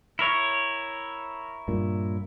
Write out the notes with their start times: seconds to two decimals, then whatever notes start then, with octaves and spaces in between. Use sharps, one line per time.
0.19 E4 A#4 C#5
1.68 G2 A#2